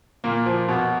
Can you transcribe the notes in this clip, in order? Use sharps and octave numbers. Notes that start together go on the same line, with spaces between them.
A#2 A#3
F3
B2